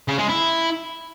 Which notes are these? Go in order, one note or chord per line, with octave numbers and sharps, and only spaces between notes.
C#3
G#3
E4